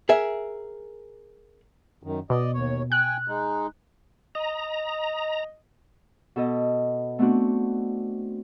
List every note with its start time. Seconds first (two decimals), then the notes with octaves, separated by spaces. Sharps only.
0.09 G#4 A#4 E5
2.03 F#2 D#3
2.30 B2 D5 D#5
2.53 D#2 C#5
2.92 G5 G#5 F#6
3.28 G#3 D#4
4.35 D#5 A#5
6.36 B2 A4 D#5
7.19 A3 B3 C4 D4 F#4